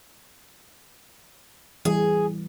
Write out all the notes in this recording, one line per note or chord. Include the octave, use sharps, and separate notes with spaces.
E3 G3 G#4